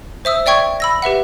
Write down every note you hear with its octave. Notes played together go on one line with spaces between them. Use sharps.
C5 E5 D#6 E6
D5 E5 G5 C#6 G#6
B5 E6 A#6
G4 B4 E5 F#5